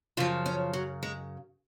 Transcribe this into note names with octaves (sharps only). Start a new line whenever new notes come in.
F#2 C#3 F3 F4
C#4
F#3
G#3